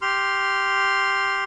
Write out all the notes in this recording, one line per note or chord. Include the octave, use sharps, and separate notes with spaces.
G4 C6 F6